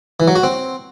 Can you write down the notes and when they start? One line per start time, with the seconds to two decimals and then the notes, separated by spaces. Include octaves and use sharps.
0.20 E3
0.28 F#3
0.36 F#4
0.43 C4